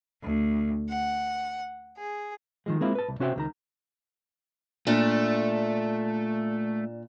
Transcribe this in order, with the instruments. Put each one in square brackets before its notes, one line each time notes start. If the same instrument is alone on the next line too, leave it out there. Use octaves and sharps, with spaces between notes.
[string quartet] D2
F#5
G#4
[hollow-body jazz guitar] D#3 F3 G#3
G#3 A#3 C4 E4 F4
B4 A5
C2
C3 C#4 F#4 C5 E5 G5
C#2 D#3 A#5
[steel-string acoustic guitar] A#2 D4 [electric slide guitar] A3